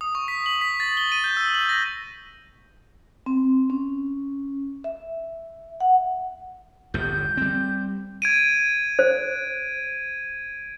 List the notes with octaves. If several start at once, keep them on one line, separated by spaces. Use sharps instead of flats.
D#6
C#6
B6
F#7
B6
A6
G7
D#7
G6
E6
F#7
A#6
C4
C#4
E5
F#5
G1 E2 A2 G6
G3 C4
G#6 D7 D#7
C5